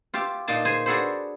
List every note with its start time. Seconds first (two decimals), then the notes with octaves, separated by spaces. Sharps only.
0.14 F4 G4 E5
0.48 A#2 A#3 D#4 A5
0.65 G#4 C5 G#5
0.86 D4 F#4 G#4 A4 B4 C5